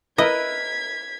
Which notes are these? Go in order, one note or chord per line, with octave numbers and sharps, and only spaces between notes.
E4 A#4 B4 D#5 G#6 B6